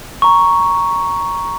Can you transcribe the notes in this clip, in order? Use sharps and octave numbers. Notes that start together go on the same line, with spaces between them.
A#5 C#6